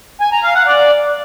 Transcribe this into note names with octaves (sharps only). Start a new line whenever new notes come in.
G#5
A#5
F5
F#5
D5